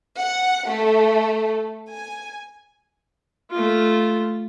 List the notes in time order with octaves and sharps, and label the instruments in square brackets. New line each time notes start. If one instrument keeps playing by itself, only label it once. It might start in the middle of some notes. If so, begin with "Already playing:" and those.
[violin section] F#5
A3
G#5
[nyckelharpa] A3 F4